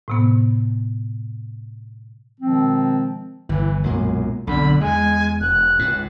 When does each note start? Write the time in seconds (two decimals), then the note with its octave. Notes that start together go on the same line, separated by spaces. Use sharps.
0.08 A2 C3 B3
2.41 B2 D#3 F3 G#3 C4
3.49 G1 E3
3.84 B1 F#2 A#2 G#3
4.47 B1 F2 D3 B5
4.81 E2 G#3 G#5
5.41 E1 F#6
5.79 C#2 G#2